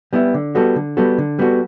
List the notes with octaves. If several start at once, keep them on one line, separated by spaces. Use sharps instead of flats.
G3 B3 E4
D3
G3 B3 F#4 A4
D3
G3 B3 F#4 A4
D3
G3 B3 F#4 A4